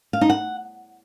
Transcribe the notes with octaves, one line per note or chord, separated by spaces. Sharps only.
F5
D#4
F#5